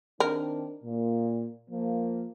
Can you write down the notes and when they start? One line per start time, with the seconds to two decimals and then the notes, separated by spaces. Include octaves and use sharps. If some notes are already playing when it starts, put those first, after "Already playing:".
0.20 D#3 C4 D4 A#4
0.84 A#2
1.71 F3 A#3